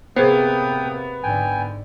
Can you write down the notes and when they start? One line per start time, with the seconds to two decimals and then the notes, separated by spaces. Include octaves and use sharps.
0.16 C3 A#3 B3 G#4 C5 G5 D#6
1.23 G#2 D3 G5 G#5